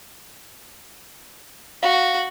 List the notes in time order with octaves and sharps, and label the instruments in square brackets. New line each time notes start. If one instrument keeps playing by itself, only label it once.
[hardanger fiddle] F#4 [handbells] F5